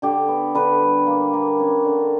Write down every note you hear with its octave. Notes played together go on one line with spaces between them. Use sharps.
D3 G4
B3
D3 B4
G3
A#3
A#3
C#4
D3